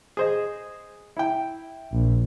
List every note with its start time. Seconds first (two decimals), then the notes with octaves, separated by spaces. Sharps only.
0.17 G#4 C5 D#5
1.17 E4 G5
1.92 A#1